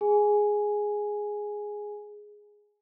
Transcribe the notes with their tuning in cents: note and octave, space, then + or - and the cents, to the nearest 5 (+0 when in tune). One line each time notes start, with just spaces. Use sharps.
G#4 +0 G#5 +0